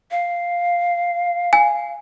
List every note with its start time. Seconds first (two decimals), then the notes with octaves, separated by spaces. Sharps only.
0.11 F5
1.53 G#5